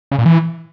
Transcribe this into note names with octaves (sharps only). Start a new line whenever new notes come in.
C#3
A#2
E3